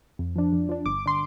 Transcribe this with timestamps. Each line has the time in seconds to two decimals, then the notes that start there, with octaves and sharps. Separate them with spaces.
0.19 F2
0.36 F3 D4
0.52 F2
0.69 F3 D4
0.86 G1 D6
1.06 D3 C6